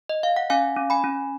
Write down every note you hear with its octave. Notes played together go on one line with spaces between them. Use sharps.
D#5
F5
F#5
C#4 F5 G#5
C#4
G#5 B5
C#4